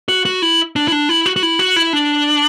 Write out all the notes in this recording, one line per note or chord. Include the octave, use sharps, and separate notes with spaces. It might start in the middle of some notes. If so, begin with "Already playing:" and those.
F#4
F#4
E4
D4
E4
D4
E4
F#4
F#4
E4
F#4
E4
D4